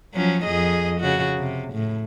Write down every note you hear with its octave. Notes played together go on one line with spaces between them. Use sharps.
F3 F#3 C#4
F2 G#4 D#5
C#3 F#4
C3
A2